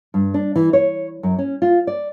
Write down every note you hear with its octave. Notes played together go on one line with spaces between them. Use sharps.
G2
D4
E3
C#5
F#2
C#4
F4
D5